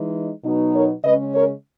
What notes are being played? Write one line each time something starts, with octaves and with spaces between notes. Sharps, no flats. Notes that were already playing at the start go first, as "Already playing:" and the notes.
Already playing: E3 G#3 D#4
B2 F#3 B3 D#4
A#4 C#5
C#3 G#3 C#4 B4 D#5
A#4 C#5